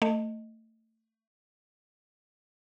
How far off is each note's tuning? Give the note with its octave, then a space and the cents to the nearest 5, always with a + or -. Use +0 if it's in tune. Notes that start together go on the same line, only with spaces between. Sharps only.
A3 +25 D#5 +0